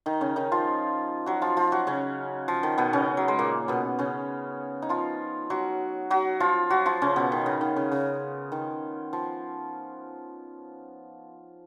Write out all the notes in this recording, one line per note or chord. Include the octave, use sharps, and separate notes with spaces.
D#3 D#4
C#3 C#4
D#3 D#4
F3 F4
F#3 F#4
F3 F4
F3 F4
F#3 F#4
C#3 C#4
F3
D#3
B2 B3
C#3 C#4
F#3
G#3
A#2 A#3
B2 B3
C#3 C#4
D#4
F3 F4
F#3 F#4
F#3 F#4
F3 F4
F#3 F#4
F3 F4
C#3 C#4
B2 B3
D#3
C#3
D#3
C#3
C#3
D#3
F3